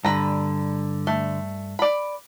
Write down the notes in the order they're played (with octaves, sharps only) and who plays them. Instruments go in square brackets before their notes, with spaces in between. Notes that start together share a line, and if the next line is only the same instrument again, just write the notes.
[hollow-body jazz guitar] G2 [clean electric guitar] D3 [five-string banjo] B4 A#5
[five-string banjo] A3
D5 B5